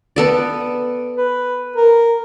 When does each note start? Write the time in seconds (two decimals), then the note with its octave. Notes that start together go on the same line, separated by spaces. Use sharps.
0.16 B3 A4 D5
1.18 B4
1.76 A#4